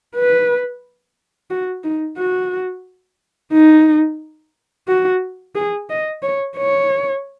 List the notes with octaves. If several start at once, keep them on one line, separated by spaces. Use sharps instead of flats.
B4
F#4
D#4
F#4
D#4
F#4
G#4
D#5
C#5
C#5